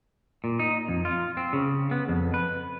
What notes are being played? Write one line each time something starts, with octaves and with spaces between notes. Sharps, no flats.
A#2
D#4
F2
F4
C4
C#3
B3
F2
B4